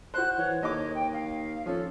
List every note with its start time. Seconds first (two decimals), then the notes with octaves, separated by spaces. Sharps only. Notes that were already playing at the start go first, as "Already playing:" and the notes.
0.14 F#4 C5 F#6
0.38 E3 C#5
0.63 D#2 D#5 D6
0.94 G5
1.13 F5
1.66 F3 C#4 A4